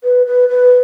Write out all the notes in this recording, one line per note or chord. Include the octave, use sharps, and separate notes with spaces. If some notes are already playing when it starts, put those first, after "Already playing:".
B4
B4
B4